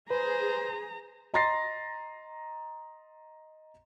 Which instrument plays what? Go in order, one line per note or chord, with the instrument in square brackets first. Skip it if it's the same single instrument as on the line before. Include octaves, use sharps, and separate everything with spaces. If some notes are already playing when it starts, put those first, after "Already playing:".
[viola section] G#4 [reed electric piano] B4 [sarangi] C5 [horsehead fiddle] A#5
[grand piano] D#5 A#5 C6 A6 A#6 C7